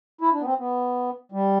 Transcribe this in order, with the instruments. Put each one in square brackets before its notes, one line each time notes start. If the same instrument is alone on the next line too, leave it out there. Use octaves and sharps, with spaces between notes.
[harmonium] E4
D4
B3
C4
B3
G3